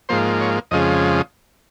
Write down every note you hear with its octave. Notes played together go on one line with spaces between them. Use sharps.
G#2 F3 A#3 C5
C#5
F2 C#3 F3 G#3 D#5